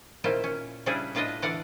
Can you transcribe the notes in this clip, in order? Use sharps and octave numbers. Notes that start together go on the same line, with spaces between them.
A#2 D#3 C#4 E4 F4 C5
C#4
C#3 G3 C#4 D4 E4 G#4
A2 D4 F4 B4 D#5
D3 E3 D5 F5 F#5